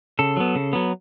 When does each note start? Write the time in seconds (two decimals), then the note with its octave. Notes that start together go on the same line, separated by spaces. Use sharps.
0.19 C#3 A4
0.37 F#3 B3
0.55 C#3
0.73 F#3 B3